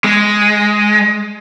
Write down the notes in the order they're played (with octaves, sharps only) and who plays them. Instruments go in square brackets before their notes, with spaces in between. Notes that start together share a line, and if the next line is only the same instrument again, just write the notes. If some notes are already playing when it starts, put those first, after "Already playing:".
[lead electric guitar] G#3